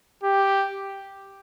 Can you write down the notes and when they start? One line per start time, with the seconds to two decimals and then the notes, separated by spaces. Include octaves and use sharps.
0.24 G4